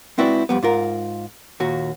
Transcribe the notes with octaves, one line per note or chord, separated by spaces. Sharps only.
G#3 C4 E4 F#4 B4 D5
F2 G3 B3
G#2 F4 A#4
D#2 A#2 F#4